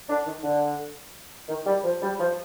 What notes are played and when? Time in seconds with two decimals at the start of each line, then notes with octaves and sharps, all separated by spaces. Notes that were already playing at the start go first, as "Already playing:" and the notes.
0.09 D4
0.26 D#3
0.43 D3
1.49 D#3
1.66 G3
1.84 F3
2.02 G3
2.19 F3